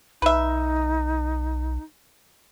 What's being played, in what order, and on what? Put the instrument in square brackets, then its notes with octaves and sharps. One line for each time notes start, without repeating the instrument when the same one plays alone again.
[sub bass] B1 [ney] D#4 [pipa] B4 E5